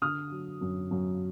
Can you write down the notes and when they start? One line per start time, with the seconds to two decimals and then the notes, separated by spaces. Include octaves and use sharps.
0.02 D3 D#6 F6
0.31 F#3
0.61 F#2
0.91 F#2